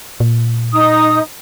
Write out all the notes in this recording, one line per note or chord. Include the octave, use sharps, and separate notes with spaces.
A#2
D#4 D#6